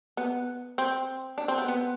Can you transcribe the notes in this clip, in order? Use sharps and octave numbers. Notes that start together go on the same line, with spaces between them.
B3
C4
D4
C4
B3
B3